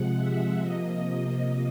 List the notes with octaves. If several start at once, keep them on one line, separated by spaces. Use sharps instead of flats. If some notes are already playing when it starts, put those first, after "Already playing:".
Already playing: C3 F3 G#3 F#5
E5
C3 F3 A#3 D#5